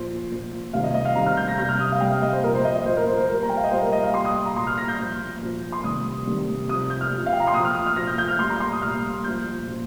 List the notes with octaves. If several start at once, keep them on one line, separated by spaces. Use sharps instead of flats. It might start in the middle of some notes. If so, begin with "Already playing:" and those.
Already playing: A#2 F3 C5
A#2 F3
C3 D#3 G3 F5
D#5
D#5
F5
C3 D#3 G3 A#5
F6
G6
A#6
C3 G3 G6
F6
D#6
F5
C3 G3 G5
F5
D#5
C5
A#2 F3 A#4
C5
D#5
D#5
A#2 F3 C5
A#4
C5
C5
A#2 G3 A#4
A#5
G5
F5
D#5
A#2 G3 C5
A#4
D#5
F5
A#2 G3 C6
D#6
C6
A#5
A#2 G3 C6
F6
A#6
G6
A#2 F3
A#2 F3
C6
C3 D#3 G3 D#6
C3 D#3 G3
C3 F3 D#6
G6
F6
C3 F3
F5
G5
A#5
C6
A#2 F3 D#6
F6
D#6
F6
A#2 F3 A#6
G6
G6
F6
A#2 G3 C6
A#5
C6
D#6
A#2 G3 F6
A#2 F3 G6
A#2 F3